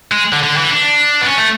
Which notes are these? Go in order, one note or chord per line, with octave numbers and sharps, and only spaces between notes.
G#3
D3
D3
E3
D4
B3
C#4
A3